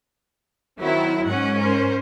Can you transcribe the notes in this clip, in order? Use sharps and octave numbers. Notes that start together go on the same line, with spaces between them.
D#3 F#3 C4 E4
G#2 C#4 F#5
A#4 C5